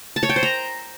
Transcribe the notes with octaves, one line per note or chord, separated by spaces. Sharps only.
A5
C#5
G5
C5
A#5